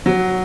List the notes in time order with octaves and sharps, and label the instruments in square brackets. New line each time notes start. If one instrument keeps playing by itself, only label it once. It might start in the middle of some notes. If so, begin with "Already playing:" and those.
[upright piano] F#3